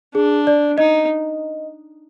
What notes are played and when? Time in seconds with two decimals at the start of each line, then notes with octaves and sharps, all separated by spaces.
0.15 D4 G#4
0.47 D5
0.78 D#4 D#5